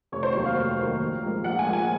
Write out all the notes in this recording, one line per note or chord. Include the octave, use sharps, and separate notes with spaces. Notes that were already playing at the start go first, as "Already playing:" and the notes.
F1 C#5
C5
D#2 D#3 F#3 A#3 C5
F5
F1
D#2 D#3 F#3 A#3
A#1
G#2 F3 A#3
A#1 F#5
G#5
G#2 F3 A#3
G#5